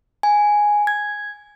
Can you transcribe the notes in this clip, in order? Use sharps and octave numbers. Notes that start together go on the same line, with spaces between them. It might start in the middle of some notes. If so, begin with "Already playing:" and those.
G#5
G#6